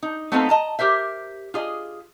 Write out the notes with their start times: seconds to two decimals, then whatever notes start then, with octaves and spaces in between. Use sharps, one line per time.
0.03 D#4
0.32 A3 B3 C4 D#4 F4 A4
0.49 D#5 A5 A#5
0.79 G4 A#4 C5 E5
1.54 F4 G#4 D#5